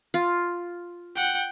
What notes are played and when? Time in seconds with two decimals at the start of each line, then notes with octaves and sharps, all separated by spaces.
0.14 F4
1.15 F#5 G5